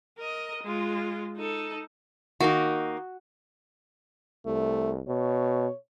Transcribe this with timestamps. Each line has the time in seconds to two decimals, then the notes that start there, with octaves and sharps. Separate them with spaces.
0.18 A#4 D#5
0.63 G#3 F4
1.37 D#4 A4
2.40 D#3 A#3 D#4 F#4
4.46 C2 A3
5.07 B2 C#5